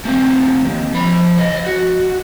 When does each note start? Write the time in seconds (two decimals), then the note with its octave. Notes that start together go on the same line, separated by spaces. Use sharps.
0.05 A3 C4
0.65 D#2
0.93 F3 B5
1.38 C#5 D#5
1.66 F#4